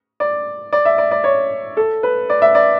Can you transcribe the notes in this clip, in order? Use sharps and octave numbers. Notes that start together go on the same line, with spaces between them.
D5
D5
E5
D5
D5
C#5
A4
B4
D5
E5
D5